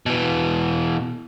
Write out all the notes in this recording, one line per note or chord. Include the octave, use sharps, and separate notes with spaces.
B2 E3